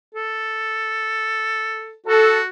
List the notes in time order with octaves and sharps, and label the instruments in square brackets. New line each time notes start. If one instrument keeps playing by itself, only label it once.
[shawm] A4
[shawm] F#4 [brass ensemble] A4